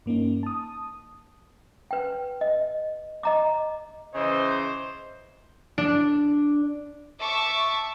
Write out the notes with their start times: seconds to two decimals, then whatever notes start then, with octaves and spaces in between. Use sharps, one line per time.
0.06 G2 A#3 C#4 D#4
0.43 A5 D#6
1.91 B4 G5
2.41 D#5
3.23 D#5 A#5 D6
4.15 C#3 E3 C5 D#5
5.78 D4
7.20 E5 A5 C#6 D6